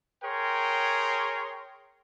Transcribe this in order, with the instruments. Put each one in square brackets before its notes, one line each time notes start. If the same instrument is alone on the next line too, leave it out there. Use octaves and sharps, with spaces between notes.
[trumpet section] G#4 A#4 C#5 G5 C6